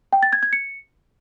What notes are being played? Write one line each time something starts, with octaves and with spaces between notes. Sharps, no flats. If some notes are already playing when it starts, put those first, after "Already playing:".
G5
A6
G#6
G#6
C#7